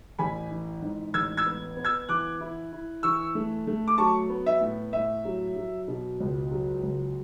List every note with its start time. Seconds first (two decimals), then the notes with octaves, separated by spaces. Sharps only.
0.19 A1 G#5 B5
0.51 E3
0.82 G#2
1.14 A1 E6 G#6
1.37 E6 G#6
1.46 B3
1.77 B3
1.84 E6 G#6
2.09 E3 D6 F#6
2.41 E4
2.73 E4
3.03 E3 C#6 E6
3.35 A3
3.67 A3
3.88 D6
3.98 F#3 A5 C#6
4.29 B3
4.46 E5
4.61 A2
4.93 A2 E5
5.25 F#3
5.56 F#3
5.88 B2
6.20 C#2
6.51 F#3
6.83 C#2